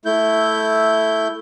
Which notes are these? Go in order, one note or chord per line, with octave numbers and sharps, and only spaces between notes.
A3 E4 G6